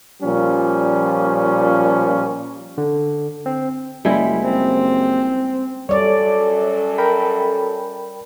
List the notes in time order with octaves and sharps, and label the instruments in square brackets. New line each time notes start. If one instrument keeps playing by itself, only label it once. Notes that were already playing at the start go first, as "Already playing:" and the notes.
[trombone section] A#2 F3 G3 C#4
[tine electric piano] D3
C4
[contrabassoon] F#1 [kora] G3 G#3 E4
[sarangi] C4
[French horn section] F#2 A4 [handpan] G3 D5 [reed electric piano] C#5
[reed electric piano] A#4 G5 B5